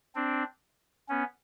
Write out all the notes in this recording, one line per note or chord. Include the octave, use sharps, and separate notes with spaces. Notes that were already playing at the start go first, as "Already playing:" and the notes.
C4 D4
B3 C#4